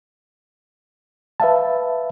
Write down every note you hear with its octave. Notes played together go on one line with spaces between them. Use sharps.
B4 E5 F5 A5